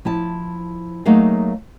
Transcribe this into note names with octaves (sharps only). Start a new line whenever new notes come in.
F3 E4 A5
F#3 A3 A#3 D#4 G#4 F5